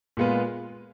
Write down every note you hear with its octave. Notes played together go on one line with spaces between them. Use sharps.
A#2 G#3 B3 F4 B4